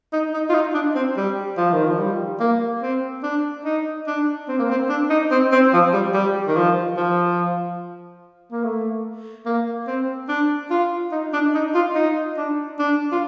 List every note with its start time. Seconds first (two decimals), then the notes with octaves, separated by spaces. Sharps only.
0.13 D#4
0.33 D#4
0.50 F4
0.54 D#4
0.74 D4
0.95 C4
1.17 G3
1.58 F3
1.73 D#3
1.87 F3
2.00 G3
2.40 A#3
2.82 C4
3.23 D4
3.65 D#4
4.07 D4
4.49 C4
4.59 A#3
4.69 C4
4.89 D4
5.10 D#4
5.31 C4
5.52 C4
5.73 F3
5.94 G3
6.14 G3
6.47 D#3
6.56 F3
6.97 F3
8.52 A#3
8.64 A3
9.46 A#3
9.87 C4
10.29 D4
10.71 F4
11.12 D#4
11.33 D4
11.54 D#4
11.75 F4
11.95 D#4
12.37 D4
12.79 D4
13.12 F4